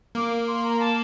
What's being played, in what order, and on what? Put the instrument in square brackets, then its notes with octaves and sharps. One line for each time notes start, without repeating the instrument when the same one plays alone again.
[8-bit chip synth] A#3 [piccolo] D6
[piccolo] C6
A#5
A5